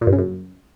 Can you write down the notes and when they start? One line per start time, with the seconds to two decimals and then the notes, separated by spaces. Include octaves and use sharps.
0.01 A#2
0.07 G2
0.13 C#3
0.18 F#2